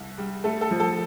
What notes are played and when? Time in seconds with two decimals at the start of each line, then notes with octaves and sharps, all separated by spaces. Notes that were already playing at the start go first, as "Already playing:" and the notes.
Already playing: C2
0.18 G3
0.44 A3 A4
0.61 A4
0.71 F3
0.80 A4